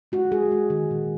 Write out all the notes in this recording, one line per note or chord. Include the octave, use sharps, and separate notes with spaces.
G#3 F#4
G#3 G#4
G#3
D#3
A#2